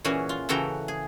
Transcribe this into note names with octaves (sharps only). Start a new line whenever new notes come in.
A#2 E3 C#4 F#4 G#4
F4
C#3 E3 F#4 A4 G5 A#5
G#4